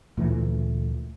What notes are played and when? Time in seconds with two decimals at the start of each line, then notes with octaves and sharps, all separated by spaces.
0.17 D2 A#2 E3 A3